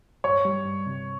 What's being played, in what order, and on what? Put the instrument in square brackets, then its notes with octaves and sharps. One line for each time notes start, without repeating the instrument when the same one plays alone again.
[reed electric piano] G2 [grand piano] C#5
[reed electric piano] G3
G2
C3